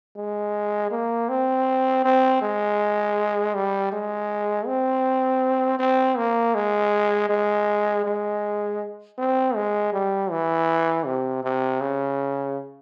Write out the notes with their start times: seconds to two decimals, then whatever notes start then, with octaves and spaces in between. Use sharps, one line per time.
0.16 G#3
0.91 A#3
1.29 C4
2.04 C4
2.42 G#3
3.54 G3
3.92 G#3
4.66 C4
5.79 C4
6.17 A#3
6.54 G#3
7.29 G#3
8.04 G#3
9.18 C4
9.55 G#3
9.93 G3
10.30 E3
11.06 C3
11.43 C3
11.81 C#3